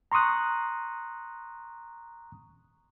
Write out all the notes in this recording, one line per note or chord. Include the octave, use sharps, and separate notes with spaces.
A#5 C6 C#6 D#6 F#6